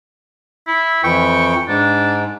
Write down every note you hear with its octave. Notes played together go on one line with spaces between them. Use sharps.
E4
F2 E3 G5 C#6
G#2 D4